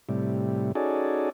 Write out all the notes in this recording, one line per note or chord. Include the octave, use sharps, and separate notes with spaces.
A2 C3 G3
C#4 D#4 F#4 G#4 A4 D5